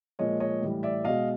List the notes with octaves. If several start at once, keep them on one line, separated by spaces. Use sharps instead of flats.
A#2 F3 G#3 C#5 D#5
C#5 D#5
A2 E3 G3
D5 E5
B2 G#3 D#5 F5